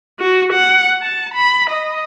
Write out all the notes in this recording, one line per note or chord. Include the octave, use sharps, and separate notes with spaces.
F#4
F#5
A5
B5
D#5